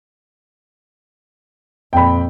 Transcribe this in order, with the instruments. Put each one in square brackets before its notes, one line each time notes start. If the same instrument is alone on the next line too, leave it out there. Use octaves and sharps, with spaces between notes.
[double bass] F2 A#2 [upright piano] G5 B5